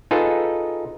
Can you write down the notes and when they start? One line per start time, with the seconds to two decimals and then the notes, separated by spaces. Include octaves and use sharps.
0.11 D#4 F4 G#4 A4 B4